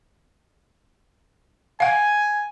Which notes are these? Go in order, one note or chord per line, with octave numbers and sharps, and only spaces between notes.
F5 F#5 G#5